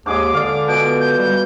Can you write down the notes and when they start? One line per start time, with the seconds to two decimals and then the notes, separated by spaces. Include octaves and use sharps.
0.06 D#2 G#2 G#4 D#5 D6
0.34 D3 D5 F5
0.68 B2 G#4 D7
0.99 G6
1.18 G3